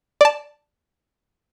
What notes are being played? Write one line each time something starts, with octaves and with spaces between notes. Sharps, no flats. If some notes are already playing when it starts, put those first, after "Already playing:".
D5 A5